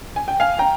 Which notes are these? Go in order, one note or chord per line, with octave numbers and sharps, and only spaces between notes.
G#5
G5
F5 G#5
G5 A#5